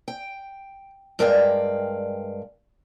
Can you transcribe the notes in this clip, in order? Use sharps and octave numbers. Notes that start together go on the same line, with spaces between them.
G5
G2 G#3 A#4 D5 F5 G5